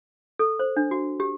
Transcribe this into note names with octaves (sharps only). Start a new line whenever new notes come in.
A4
C5
D4
F#4
G4